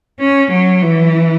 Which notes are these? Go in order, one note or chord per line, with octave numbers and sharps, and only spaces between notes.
C#4
F#3
E3